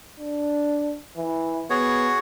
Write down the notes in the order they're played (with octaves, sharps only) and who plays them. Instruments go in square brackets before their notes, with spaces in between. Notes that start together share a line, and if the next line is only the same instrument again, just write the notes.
[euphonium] D4
E3
[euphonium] B3 [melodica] F#4 G#4 C#5